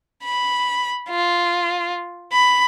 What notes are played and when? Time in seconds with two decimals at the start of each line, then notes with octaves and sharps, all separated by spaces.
0.24 B5
1.09 F4
2.33 B5